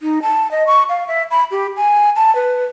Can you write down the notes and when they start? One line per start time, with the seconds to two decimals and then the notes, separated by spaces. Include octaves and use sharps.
0.01 D#4
0.22 A5
0.51 D#5
0.67 C#6
0.89 F5
1.08 E5
1.31 B5
1.51 G4
1.77 G#5
2.16 A5
2.35 B4